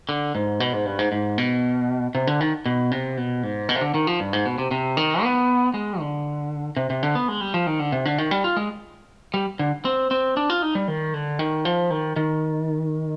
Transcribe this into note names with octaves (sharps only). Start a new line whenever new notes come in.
D3
G#2
B2
G#2
G2
G#2
G#2
B2
C3
D3
D#3
B2
C3
B2
G#2
B2
C3
D3
D#3
F3
G2
G#2
B2
C3
C3
D#3
B3
G#3
D3
C3
C3
D3
B3
G#3
G3
F3
D#3
D3
C3
D3
D#3
G3
F4
G#3
G3
D3
C4
C4
D4
F4
D#4
G3
D#3
D3
D#3
F3
D#3
D#3